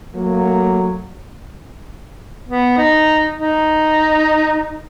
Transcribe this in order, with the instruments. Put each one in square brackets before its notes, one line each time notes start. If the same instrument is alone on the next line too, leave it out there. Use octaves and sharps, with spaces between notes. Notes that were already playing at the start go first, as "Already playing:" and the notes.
[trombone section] F#3 A3 A#3
[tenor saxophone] B3
D#4
D#4